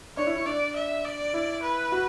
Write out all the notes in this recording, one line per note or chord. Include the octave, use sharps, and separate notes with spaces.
D4 C#5
E4
E4
D4 D5
E5
D5
E4
B4
F#4